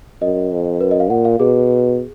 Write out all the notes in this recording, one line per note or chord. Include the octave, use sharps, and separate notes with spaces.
F#2 D#5
F2
F#2 B4
D#5
F5
A#2 F#5
F5
B2 G#4